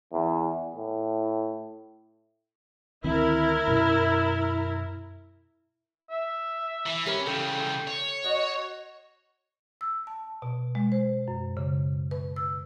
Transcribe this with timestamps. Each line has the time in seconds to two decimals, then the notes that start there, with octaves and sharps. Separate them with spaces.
0.14 E2
0.76 A2
3.04 D2 D#3 C4 E4 A#4
3.67 F#2 B2
6.10 E5
6.86 E3
7.06 C#4 G4 A#4 B4
7.26 C#3 E3 A4 G5
7.88 C#5
8.24 F#4 D#5
9.81 E6
10.07 A5
10.42 B2
10.75 G#3
10.92 C5
11.28 F#2
11.57 C#3
12.11 B4
12.36 E6